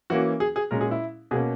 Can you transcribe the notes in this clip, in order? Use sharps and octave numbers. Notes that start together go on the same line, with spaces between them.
E3 A#3 C#4 F#4
G#4
G#4
A#2 G#3 C#4 A#4
G#4
E4
B2 A#3 C#4 G#4